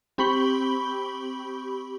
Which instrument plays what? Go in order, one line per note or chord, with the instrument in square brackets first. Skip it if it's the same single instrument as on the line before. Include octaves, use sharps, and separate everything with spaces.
[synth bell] C4 G4 B5 C#6 F#7 G7